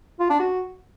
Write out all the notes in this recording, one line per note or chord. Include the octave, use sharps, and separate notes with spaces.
F4
D4
F#4